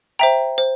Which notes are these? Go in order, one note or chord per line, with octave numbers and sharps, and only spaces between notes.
C5 E5 G5 A#5
C5